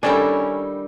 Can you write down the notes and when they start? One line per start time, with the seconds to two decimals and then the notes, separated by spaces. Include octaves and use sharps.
0.03 D#3 G3 C#4 D4 E4 A4 G5 G#5